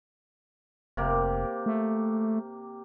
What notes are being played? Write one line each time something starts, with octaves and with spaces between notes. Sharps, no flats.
F1 C3 A#3 G4
A3